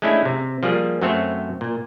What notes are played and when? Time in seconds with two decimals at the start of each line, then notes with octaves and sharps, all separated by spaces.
0.02 G#3 A3 C#4 D4 E4
0.25 C3
0.63 F3 G3 A#3 G#4
1.01 F#2 F#3 A3 C4 C5 C#5
1.61 A#2